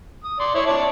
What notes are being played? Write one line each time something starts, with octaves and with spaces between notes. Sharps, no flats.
D#6
D5 C6
E4 C#5
C#5 D5 A5